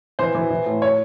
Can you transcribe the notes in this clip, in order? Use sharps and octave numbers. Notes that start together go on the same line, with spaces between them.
E3 C5
E3
E3
A2
C#5